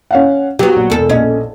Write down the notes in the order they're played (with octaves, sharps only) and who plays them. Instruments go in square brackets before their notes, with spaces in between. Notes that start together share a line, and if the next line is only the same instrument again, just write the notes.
[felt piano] C#4 F5 F#5
[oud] F#3 B3 [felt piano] G4
[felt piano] A#1
[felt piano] E1 [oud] E2 A4
[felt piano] A#1 D#5 [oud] C#4